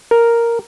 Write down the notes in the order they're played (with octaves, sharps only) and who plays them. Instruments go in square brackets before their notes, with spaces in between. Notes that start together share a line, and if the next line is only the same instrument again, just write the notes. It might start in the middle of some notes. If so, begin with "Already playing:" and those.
[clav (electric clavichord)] A#4